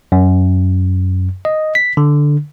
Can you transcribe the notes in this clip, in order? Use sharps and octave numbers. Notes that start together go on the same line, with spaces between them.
F#2
D#5
B6
D3